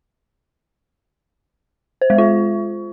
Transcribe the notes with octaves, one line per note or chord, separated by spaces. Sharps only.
C5
G#3
F4